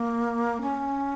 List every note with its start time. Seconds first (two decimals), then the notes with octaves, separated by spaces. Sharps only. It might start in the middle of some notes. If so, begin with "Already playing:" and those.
Already playing: A#3
0.61 C#4